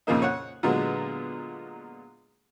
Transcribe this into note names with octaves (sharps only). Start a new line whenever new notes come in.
F2 A#2 C#3 A#3 D#4
C#5 F#5
A#2 D3 F#3 G#3 B3